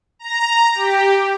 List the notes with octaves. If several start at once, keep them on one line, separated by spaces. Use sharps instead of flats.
A#5
G4